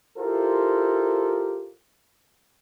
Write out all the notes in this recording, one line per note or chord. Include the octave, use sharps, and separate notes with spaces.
E4 F4 G4 A4 A#4 C5